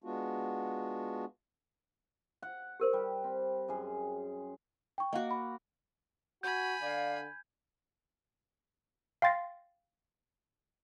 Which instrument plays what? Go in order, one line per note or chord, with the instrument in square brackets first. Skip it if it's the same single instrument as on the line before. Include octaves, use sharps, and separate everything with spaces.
[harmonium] G#3 B3 D4 F4 F#4
[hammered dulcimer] F#5
[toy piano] G4 A#4 C5
[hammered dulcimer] G3
C4
F#2 G#4
[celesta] G5 C#6
[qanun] A#3 F#4 [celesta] D#5 F5 F#5
[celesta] B5
[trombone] F#4 [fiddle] G#5 B5 [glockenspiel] G6 G#6
[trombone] D3 [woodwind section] D5 F5
[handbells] F5 G5 C6 A6 A#6 C7